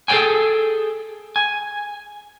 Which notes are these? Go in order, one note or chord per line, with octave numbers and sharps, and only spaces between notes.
G#4 A4 C#5 G5 G#5
G#5